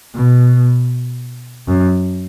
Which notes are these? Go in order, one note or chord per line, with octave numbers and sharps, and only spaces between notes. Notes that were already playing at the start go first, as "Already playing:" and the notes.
B2
F#2